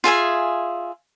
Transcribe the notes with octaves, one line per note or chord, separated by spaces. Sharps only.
F4 G#4 E5 G#5